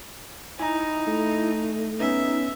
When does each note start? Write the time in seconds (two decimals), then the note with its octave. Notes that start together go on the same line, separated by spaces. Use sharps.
0.59 D#4 E4 G#5 A#5
1.07 A3
2.00 B3 C#4 D#4 B4 E5